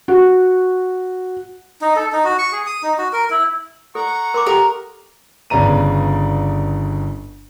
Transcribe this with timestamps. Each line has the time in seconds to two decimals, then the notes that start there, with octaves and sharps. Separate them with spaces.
0.08 F#4
1.82 D#4
1.96 A4
2.13 D#4
2.25 F#4
2.38 C#6
2.52 G#4
2.66 D#6
2.83 D#4
2.98 F#4
3.13 A#4
3.30 E4
3.95 A4 F#5 A#5 C#6
4.34 A#4 C6 D6
4.46 G4 A4 A#4 F5
5.50 G1 C#3 B3 D5 A#5 D#7